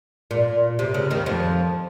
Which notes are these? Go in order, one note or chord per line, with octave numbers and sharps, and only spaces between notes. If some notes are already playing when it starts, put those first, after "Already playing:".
A#2
C3
C#3
D#2 D#3
F2 F3